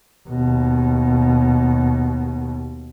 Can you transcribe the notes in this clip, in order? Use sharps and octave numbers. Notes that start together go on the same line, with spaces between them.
D#2 B2